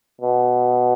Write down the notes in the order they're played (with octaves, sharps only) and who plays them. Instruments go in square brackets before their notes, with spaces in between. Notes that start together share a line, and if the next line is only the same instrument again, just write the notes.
[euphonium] B2